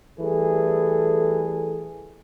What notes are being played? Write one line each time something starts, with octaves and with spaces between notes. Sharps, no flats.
E3 G3 A3 G#4 A4